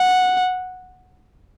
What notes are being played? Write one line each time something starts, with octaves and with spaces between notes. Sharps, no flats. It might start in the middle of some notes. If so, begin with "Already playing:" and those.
Already playing: F#5